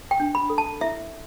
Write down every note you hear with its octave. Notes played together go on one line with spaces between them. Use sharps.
G5
D4
B5
A4
A5
E4 E5